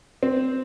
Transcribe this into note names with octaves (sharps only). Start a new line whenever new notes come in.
C4